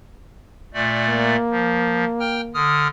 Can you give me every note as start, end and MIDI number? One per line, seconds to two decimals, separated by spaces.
0.74 1.36 46
0.74 1.36 57
0.74 1.36 74
1.09 2.64 58
1.51 2.05 53
2.20 2.41 79
2.20 2.41 89
2.54 2.88 50
2.54 2.88 87
2.54 2.88 89